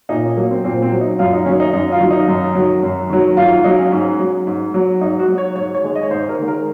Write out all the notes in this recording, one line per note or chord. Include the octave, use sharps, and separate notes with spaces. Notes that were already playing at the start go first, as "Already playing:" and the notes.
A#2 D#4
C#4
F#3 A#3
C4
A#2 C4
C4
F#3
D#4
F#2 F4
D#4
D#3 F#3 C#4
D#4
F#2 D#4
F4
D#3 F#3
D#4
F#2
D#3 F#3
F#2
D#3 F#3
G#2 F4
F4
F#3 D#4
C#4
G#2
F#3
G#2
F#3
G#2 D#4
F#4
F#3
C#5
G#2 C#5
C#5
D#3 G#3
D#5
C#5
G#2 C5
A#4
D#3 G#3
A#4